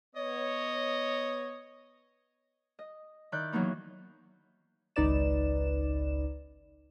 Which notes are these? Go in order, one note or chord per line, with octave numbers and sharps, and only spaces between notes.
B3 C#5 D#5
D#5
D#3 E4 D5 F#6 G6
E3 F#3 A#3 B3 D#4
G#1 C#2 D#4 B4 D5 E7